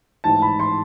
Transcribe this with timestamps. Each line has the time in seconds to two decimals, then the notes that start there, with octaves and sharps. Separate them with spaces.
0.24 A1 G#2 E3 A5
0.42 B5
0.59 C6